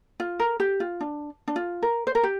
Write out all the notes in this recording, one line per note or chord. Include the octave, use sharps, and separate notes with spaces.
F4
A#4
G4
F4
D4
D4
F4
A#4
C5
A#4
G4